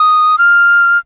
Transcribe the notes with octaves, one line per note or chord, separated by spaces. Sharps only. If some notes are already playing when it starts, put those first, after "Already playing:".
Already playing: D#6
F6